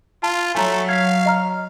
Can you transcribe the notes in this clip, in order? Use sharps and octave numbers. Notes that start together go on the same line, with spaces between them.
F4 A5
F#3 A3 G#5 A#5
F5 G#6 B6
D#5 A#5 F6